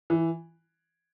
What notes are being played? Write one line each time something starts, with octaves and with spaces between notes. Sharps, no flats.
E3